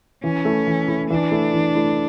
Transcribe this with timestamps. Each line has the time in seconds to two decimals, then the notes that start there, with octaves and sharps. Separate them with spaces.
0.24 E3 C#4
0.45 A3 E4
0.67 E3
0.88 A3 E4
1.10 E3 D4
1.32 A3 E4
1.53 E3
1.75 A3 E4